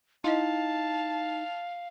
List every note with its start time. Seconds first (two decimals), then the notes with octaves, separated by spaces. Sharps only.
0.24 D#4 E4 D#5 F5 A5